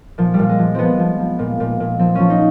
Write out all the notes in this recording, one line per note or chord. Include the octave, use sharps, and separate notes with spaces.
A#2 F3
A#2 G3
G#3
F3
F3 B3 C4
F3
F3
A#2
A#2
A#2
F3 C4
F3 C#4
D#4